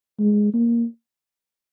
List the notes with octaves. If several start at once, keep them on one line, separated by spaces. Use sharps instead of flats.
G#3
A#3